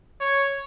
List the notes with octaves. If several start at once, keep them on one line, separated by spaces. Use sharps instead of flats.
C#5